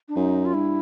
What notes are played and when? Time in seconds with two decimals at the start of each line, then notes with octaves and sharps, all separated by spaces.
0.08 D4
0.16 F#2 D#4
0.45 F4
0.54 G2 E4